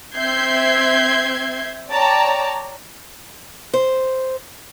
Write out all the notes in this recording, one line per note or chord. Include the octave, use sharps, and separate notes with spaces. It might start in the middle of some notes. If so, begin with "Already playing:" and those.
C4 E5 G6 G#6 C7
C#5 D5 G5 A5 A#5
C5